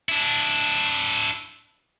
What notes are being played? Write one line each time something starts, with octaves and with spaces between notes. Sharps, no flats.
D4 E4